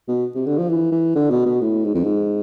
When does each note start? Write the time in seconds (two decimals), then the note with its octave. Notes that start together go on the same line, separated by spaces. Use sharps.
0.08 B2
0.35 C3
0.46 D3
0.58 F3
0.69 E3
0.92 E3
1.15 D3
1.30 B2
1.46 B2
1.61 A2
1.84 G#2
1.94 F2
2.04 G#2